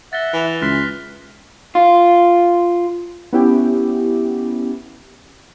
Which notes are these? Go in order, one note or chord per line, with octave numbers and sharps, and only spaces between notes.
E5 F#5 A6 A#6 G7
E3 F7 G7
C#2 C6 F6 F#6 B6
F4
B3 C#4 E4 G4